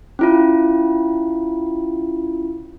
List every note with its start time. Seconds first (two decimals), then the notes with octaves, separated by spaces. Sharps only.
0.19 C#4 E4 F4